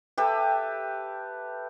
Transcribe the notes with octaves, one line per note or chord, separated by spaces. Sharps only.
G4 A4 B4 E5